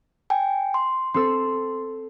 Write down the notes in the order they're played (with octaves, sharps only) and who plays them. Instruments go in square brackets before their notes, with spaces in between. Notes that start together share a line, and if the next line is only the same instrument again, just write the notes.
[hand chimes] G5 G#5
C6
[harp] C4 A4 E6 [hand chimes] C6